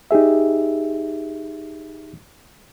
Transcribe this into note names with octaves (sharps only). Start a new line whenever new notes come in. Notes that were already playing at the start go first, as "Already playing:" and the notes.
D#4 G4 G#4 E5